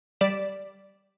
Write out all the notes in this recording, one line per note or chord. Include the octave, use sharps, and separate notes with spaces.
G3 D5 B6 E7